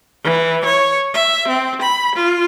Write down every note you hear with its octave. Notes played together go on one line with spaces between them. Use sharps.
E3
C#5
E5
C4
B5
F4